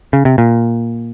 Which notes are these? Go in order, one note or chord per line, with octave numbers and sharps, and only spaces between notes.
C#3
C3
A#2